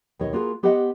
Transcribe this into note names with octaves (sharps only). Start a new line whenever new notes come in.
D#2 B2 D#4 C#5 D#5
A#3 F4 F#4 G#4 B4
B3 G4 B4 C5 D#5 F#5